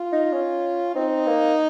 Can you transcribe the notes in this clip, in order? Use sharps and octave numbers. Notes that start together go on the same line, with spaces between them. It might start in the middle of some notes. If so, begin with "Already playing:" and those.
Already playing: F4
D#4
C#4
C4 D#4
A#3